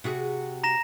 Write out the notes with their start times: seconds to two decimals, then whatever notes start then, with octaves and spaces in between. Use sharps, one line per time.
0.04 C3 F#4 G#4
0.64 A#5 A#6 E7